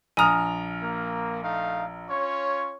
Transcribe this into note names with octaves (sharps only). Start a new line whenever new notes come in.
A#1 G#5 A#5 D#6 F6
A#3
A3 D#4 F5
C#4 F4 C#5